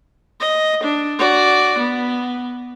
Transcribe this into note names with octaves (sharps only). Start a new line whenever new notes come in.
D#5
D4
F#4 D5
B3